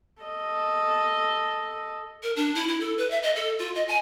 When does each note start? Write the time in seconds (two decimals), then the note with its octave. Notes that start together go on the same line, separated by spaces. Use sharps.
0.23 A4 D#5
2.23 A#4
2.36 D4
2.55 E4
2.68 E4
2.80 A4
2.98 B4
3.10 E5
3.23 D#5
3.36 A4
3.59 F4
3.75 D#5
3.88 G#5